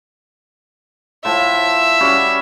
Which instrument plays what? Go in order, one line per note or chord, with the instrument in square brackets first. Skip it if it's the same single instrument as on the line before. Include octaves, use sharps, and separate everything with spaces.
[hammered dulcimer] A2 F3 A5 [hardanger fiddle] E5
[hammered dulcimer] G3 C#4 F#4